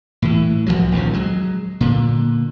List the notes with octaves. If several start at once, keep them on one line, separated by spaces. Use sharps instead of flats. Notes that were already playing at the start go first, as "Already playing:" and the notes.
A2 E3
C2 F#2 F3 F#3
A#1 D#2 A#2 C#3
F#3 G#3
A#2 D3